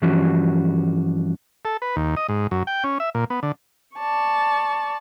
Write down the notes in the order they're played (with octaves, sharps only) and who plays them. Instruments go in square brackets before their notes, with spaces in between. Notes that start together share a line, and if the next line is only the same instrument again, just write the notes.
[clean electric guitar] G2 E3 F3 G3 C#4 F#4
[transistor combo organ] A4
B4
D#2
D#5
G#2
F#2
G5
C#4
E5
A#2
B3
D3
[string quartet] D5 A5 C#6